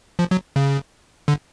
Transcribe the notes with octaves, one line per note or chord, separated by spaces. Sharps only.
F3
F#3
C#3
D3